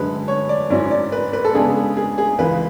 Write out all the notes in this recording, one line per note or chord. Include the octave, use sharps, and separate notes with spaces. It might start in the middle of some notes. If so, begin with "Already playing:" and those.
Already playing: F#2 D3 G#3 B4
C#5
D5
G#2 F#3 C#4 E4 D5
D5
B4
B4
A4
C#3 G#3 B3 D4 G#4
G#4
G#4
C#2 C#3 E3 G#3 B4